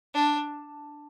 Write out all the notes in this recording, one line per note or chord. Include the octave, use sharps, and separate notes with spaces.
D4